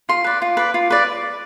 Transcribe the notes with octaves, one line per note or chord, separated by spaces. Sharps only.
F4 C6
B4 D5
F4
B4 D5
F4
B4 D5